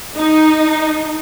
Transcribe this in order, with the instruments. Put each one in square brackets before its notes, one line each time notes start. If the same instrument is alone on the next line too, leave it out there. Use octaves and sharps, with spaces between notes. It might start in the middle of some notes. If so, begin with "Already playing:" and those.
[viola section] D#4